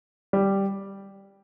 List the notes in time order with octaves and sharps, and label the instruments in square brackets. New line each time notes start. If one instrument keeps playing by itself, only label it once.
[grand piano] G3